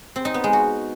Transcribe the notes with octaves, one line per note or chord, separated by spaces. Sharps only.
C4
D#4
B3
G#3
F#4